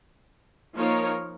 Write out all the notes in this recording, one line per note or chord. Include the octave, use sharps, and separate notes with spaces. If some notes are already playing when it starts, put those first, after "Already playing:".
F3 A#3 D#4 A#4 C#5